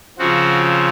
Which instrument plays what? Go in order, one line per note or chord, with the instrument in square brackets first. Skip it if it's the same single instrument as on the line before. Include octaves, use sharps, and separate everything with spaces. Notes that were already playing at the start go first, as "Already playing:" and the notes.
[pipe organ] C#3 F3 C4 F#4